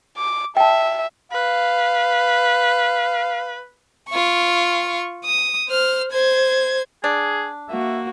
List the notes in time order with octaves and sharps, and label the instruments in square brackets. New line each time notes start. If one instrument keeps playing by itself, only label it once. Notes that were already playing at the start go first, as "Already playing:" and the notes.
[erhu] D6
[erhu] E5 [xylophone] G5 A5
[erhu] B4 [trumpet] F5
[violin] F4 C#6
D#6
C5 F6
C5 G#6
[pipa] D4 [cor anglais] G#4
[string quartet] A#3 F#4 [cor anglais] E5